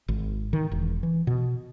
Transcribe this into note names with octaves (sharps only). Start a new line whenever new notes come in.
G#1
D#3
E1
E3
B2